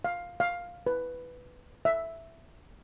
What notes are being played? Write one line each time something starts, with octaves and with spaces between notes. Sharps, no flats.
F5
F5
B4
E5